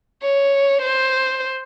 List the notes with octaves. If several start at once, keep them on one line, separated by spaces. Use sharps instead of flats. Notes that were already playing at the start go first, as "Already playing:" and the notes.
C#5
C5